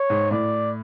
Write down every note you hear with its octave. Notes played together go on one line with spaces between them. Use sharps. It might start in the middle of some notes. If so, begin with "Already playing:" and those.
Already playing: C#5
G#2
A2 D5